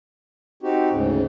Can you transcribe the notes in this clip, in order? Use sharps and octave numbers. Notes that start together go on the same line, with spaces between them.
C4 D#4 F#4 G4
D2 G#2 C#3